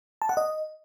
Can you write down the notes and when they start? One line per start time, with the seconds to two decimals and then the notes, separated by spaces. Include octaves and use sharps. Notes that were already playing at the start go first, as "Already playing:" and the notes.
0.22 A5
0.29 F#5
0.37 D#5